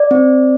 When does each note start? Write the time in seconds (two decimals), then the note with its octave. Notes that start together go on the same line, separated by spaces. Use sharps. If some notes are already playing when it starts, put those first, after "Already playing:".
Already playing: D5
0.11 C4